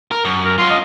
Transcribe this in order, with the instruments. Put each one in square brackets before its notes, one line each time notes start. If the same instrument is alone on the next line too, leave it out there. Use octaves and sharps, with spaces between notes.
[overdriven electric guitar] A#4
F#2
[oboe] A#4
[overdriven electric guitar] C#4 F4 [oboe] C6
[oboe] D#5